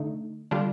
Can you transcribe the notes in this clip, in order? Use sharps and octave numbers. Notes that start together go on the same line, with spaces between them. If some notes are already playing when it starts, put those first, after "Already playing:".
Already playing: D3 A3 D#4
D3 G3 D4 F4